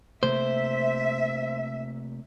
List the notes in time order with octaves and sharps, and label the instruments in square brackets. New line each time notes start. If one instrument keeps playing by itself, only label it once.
[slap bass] C3 A3 A#3 [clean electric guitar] C5 [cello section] E5